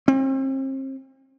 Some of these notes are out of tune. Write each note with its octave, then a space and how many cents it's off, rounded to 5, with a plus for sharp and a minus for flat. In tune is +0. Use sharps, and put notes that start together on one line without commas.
C4 +40